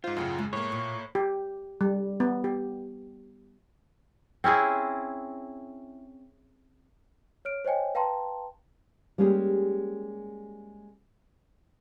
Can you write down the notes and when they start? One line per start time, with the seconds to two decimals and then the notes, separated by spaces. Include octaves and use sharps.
0.04 G#2 F4 C5
0.17 F#2 A2 C#3 F#5 G5
0.38 G#3
0.53 A2 A#3 C#5
0.72 A#2
1.15 G4
1.81 G3
2.20 B3
2.44 G4
4.44 C4 C#4 E4 G#4
7.45 C#5 F6 D7
7.65 C5 C#5 D#5 G5 G#5
7.95 B4 F5 G5 A5 A#5 C6
9.18 G3 G#3 A#3 C#4 G4 G#4